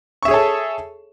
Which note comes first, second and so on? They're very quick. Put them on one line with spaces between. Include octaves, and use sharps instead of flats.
C#6 E5 G#4 C#5 A4